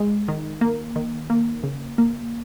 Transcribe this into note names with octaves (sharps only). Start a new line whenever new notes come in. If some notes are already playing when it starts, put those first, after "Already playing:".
Already playing: G#3
D#3
A#3
D#3
A#3
C#3
A#3